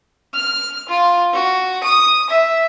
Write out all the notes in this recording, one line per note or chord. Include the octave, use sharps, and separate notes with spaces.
F6
F4
F#4
D#6
E5